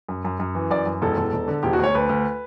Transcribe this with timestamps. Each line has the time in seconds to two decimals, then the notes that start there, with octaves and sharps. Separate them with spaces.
0.09 F#2
0.25 F#2
0.40 F#2
0.55 E3
0.70 F#2 D5
0.86 F#2
1.02 E1 A4
1.17 E1
1.33 E1
1.48 D3
1.63 E1 G4
1.73 F#4
1.78 D2
1.84 C#5
1.95 D2 B4
2.09 D2